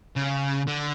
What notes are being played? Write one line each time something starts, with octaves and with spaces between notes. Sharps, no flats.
C#3
D3